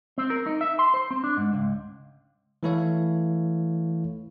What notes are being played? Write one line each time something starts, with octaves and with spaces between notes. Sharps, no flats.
C4
A#4
D#4
E5
C6
C5
C4
D4
G#2
C#2
E3 A3 E4 A4 C#5 F5